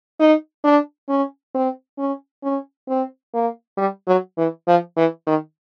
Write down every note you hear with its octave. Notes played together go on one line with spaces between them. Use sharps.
D#4
D4
C#4
C4
C#4
C#4
C4
A#3
G3
F#3
E3
F3
E3
D#3